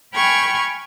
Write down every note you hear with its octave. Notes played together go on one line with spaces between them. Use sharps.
G5 G#5 B5 C#6 F6 G#6